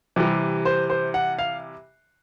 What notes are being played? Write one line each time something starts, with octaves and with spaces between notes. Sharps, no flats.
C3 E3 G3
C5
C5
F#5
F5